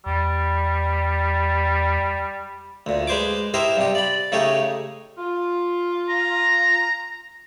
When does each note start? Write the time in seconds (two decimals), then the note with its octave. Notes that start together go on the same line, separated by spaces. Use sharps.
0.06 E2 G3
2.86 D2 A#2
3.07 G#3 B4 C5 G#5 D6
3.54 E4 G4 A#4 C5 D#5 E5
3.77 G2 C3 G4
3.95 D5 B5
4.32 C#3 A3 D#4 G4 C#5
5.18 F4
6.09 A#5